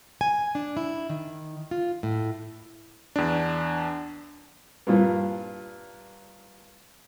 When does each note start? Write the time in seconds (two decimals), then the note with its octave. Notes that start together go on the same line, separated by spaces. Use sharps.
0.21 G#5
0.55 D4
0.77 E4
1.10 D#3
1.71 F4
2.03 A2
3.16 E2 D4
4.87 G2 A#2 F3